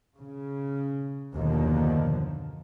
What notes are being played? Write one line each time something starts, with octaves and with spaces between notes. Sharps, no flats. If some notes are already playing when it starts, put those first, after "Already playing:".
C#3
F#1 D#2 B2 D3 D#3 F3